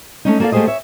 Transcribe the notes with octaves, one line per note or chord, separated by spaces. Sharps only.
A3 C#4 D#4
A#3 A4 C#5 D5 F5
A3 A#3 G4 G#4 C5 D#5
C#5 E5